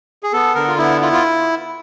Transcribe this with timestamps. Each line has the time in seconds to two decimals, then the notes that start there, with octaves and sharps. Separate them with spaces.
0.23 G#4
0.32 B3 A4
0.55 D3 A#4
0.68 F4
0.78 B3 E4
1.01 E4 F4
1.13 F4